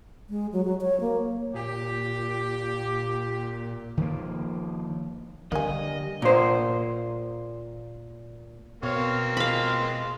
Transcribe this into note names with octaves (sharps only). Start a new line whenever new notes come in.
G#3
F#3
F#3
C#5
A#3
A#2 G4
D#3 F3 A#3
D3 G3 A#3 D#5 G#5
A#2 C5
B2 A#3 C4 C#5 F5
G#3 F4 F5 B5